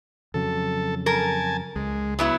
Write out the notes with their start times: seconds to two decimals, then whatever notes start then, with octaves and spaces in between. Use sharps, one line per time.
0.34 F2 C#3 F#3 A4
1.06 A#4 G#5 A5
1.76 C#2 G#3
2.19 F#3 B3 E4